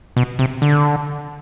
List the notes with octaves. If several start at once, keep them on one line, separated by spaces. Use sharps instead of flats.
B2
C3
D3